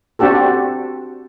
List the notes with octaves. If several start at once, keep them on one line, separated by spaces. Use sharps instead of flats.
C4 D4 F#4 G4 A4